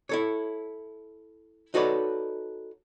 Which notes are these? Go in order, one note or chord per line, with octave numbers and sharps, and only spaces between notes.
E4 A4 C#5
D#4 F#4 A4 B4 C#5 D5